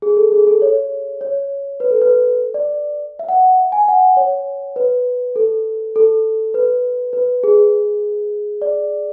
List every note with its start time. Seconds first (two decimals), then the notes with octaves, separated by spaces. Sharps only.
0.02 G#4
0.17 A4
0.32 G#4
0.47 A4
0.62 C#5
1.21 C#5
1.80 B4
1.91 A4
2.02 B4
2.54 D5
3.19 E5
3.29 F#5
3.72 G#5
3.88 F#5
4.17 C#5
4.76 B4
5.36 A4
5.96 A4
6.54 B4
7.13 B4
7.44 G#4
8.62 D5